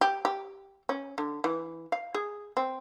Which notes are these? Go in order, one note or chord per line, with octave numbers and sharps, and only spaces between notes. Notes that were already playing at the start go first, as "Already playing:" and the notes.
G4
G4
C#4
D3
E3
F5
G#4
C4